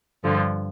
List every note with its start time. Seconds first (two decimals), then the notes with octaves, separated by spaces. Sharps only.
0.23 G2 D3 F3